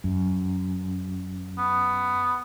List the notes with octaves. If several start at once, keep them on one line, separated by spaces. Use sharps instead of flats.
F#2
B3